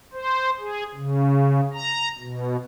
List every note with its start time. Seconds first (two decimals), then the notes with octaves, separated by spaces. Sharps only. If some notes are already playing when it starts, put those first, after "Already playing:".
0.13 C5
0.60 G#4
0.95 C#3
1.74 A#5
2.19 B2